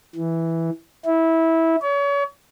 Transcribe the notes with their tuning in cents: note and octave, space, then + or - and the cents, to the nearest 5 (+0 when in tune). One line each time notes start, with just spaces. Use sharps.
E3 +0
E4 -15
C#5 +35